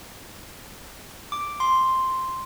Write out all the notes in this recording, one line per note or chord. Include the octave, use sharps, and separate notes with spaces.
D6
C6